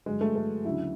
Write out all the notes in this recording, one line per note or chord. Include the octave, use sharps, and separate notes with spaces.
G2 D3 F#3 G#3
A3
A3
D2 C#3 F#3 E4